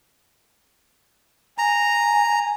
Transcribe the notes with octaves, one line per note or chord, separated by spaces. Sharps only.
G#5 A#5